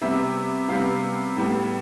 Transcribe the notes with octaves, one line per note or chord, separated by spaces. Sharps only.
C3 G3 B3 E5
C3 G3 B3 F5
A2 G3 B3